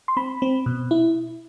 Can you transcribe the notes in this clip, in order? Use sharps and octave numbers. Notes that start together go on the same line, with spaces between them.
C6
C4 B5
C4
B2
E4